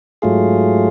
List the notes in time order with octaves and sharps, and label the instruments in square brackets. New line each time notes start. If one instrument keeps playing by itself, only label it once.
[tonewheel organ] G#2 F#3 A3 F4 G#4